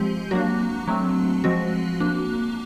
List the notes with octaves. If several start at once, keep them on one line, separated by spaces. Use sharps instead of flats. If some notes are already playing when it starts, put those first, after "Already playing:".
Already playing: F3 G#3 C4 G4
F#3 A#3 D4 F#4
F#3 A3 C4
F3 G#3 C4 F#4
F3 A#3 D4